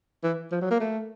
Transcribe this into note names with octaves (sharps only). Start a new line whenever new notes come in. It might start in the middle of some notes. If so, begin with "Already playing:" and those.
E3
F3
F#3
A#3
A3